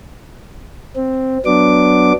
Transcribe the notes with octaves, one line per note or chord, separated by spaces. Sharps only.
C4
F#3 B3 D4 D6